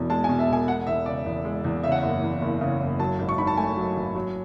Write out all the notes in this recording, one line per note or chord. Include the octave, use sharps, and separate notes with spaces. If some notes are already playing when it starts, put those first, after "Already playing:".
Already playing: E1 E2 B2
G#3 A5
G#5
B2
E5
E1 G#5
G#3 F#5
E2 E5
C#3 D5
E2
G#3
E2
C#3 E5
F#5
F#1 E5
E2
F#1
C#3
F#1
F#3 A5
G#1
C#6
G#2 B5
A5
A3 G#5
F#3
G#1
F#3